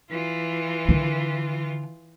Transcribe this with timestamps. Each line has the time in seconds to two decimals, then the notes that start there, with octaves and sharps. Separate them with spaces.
0.11 E3 F4
0.89 D3 D#3